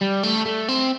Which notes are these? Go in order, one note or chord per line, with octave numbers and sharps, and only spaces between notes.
G3
A3
A3
C4